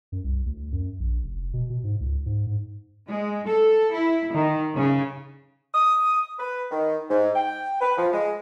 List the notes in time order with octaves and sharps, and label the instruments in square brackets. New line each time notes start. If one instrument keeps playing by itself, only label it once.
[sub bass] F#2
C2
D2
F#2
A#1
F1
B2
B2
G#2
C#2
G#2
G#2
[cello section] G#3
A4
E4
D#3
C#3
[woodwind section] D#6
B4
D#3
G#2
G5
B4
F3
G#3